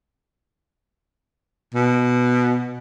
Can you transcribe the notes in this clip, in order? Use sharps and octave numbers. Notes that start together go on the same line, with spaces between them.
B2